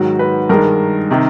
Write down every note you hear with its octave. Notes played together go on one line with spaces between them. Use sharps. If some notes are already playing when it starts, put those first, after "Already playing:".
Already playing: G#2 D#3 F#3 F#4
B4
G2 D#3 G#3 A#4
C3 D#3